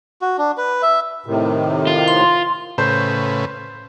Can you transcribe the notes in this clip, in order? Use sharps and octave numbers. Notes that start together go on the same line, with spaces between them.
F#4
D4
B4
E5
A2 C3 D#3
F4
C6
A2 C#3 B4 C5